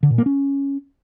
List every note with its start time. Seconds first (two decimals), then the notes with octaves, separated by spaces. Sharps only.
0.03 D3
0.10 A#2
0.18 A#3
0.26 C#4